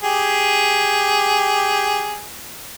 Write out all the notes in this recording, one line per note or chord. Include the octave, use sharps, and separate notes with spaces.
G4 G#4